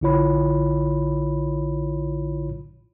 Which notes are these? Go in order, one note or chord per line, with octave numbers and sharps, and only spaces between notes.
A#1 D3 E4 F4 C#5 B5